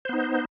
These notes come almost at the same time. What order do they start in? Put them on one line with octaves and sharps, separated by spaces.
C5 B3 D#4